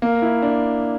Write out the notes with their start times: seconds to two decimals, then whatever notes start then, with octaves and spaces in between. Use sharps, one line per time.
0.02 A#3
0.22 E4
0.42 D4